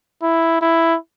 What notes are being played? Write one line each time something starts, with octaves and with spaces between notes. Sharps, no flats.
E4
E4